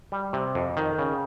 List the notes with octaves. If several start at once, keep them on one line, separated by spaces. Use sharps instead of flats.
G3
C3
F2
D#3
C#3